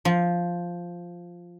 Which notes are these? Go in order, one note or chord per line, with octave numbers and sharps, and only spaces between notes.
F3